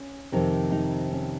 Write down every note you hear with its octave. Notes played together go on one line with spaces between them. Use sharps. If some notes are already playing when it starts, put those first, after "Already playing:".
Already playing: C#4
F2 C3 D#3 D#4
D#4
C#4